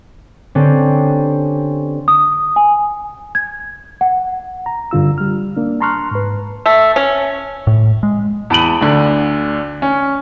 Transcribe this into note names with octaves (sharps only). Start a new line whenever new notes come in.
D3 C4 C#4 G4 F#6 A6
D#6
G#5
G#6
F#5
A#5
G2 D3 F4 E6
G3 F6
A#3 D4
A5 A#5 C6 C#6 F6 F#6
G#2 B4
A3
C#4
A2
G#3
E2 A5 B5 D7 D#7 F#7
D2 D3
C#4